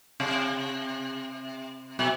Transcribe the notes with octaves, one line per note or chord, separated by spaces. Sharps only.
C3
B2